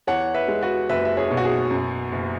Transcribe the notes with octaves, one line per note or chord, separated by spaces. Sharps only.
E2 C#5 F#5
B4 E5
G#3
F#4 B4
F#1 B4 E5
E5
G#4 C#5
B2
F#4
G#4
F#2
F#1